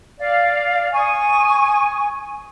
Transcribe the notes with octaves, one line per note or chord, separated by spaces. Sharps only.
D5 F5
G#5 C#6 D#6